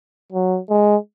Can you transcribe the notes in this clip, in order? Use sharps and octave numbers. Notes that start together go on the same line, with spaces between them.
F#3
G#3